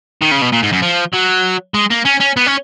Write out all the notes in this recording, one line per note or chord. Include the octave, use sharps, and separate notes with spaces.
D#3
C#3
B2
A#2
G#2
F#2
F3
F#3
G#3
A#3
C#4
C#4
B3
C#4